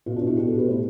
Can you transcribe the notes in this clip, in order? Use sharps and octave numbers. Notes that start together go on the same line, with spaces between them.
B2 F4
D4
B2
E4
B2 G4
A4
B2
B4
A2 C5